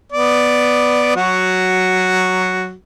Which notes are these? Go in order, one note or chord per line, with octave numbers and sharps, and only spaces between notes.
B3 D5
F#3 F#4